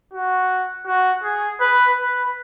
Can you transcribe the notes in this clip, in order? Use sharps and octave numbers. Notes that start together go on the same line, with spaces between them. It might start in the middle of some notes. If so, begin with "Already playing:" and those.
F#4
F#4
G#4
B4
B4